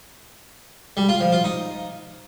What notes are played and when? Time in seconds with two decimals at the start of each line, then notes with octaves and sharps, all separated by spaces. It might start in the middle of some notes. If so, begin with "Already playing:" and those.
0.97 G3
1.09 F4
1.21 F3
1.32 F4
1.44 D#4